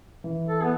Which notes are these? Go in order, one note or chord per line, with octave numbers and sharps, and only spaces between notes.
E3
A4
B3